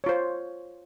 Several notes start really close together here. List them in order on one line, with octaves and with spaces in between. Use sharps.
C#5 F4 C5